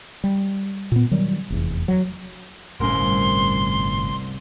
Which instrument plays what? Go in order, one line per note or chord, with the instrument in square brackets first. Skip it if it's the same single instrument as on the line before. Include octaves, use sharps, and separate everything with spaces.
[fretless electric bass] G3
A#2 B3
D#3 F#3 G3
F1 E2
F#3
[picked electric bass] G1 A2 C#4 [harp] C2 A#4 [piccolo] C6